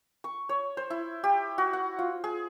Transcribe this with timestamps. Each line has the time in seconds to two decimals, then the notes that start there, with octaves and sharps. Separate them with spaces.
0.24 C#6
0.49 C#5
0.77 C5
0.90 E4
1.24 G4
1.58 F#4
1.73 F#5
1.99 F4
2.24 G#4